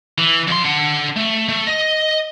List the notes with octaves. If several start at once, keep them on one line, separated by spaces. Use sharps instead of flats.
E3
F2 C6
D4 F#5
A3
A3
D#5